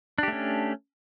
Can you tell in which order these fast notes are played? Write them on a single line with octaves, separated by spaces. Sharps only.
D4 G4 A3 C#4